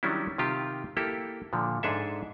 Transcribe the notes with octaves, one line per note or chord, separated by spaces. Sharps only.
D#3 F#3 G3 C#4 D4 E4
C3 D#3 F4 G4
A#3 E4 G4 A4
A#2 D3 F3
G#2 D4 G#4 A4 E5